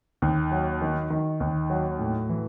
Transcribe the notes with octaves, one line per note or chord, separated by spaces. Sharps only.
D#2
F#3
D#3
D#3
D#2
F#3
A2
E3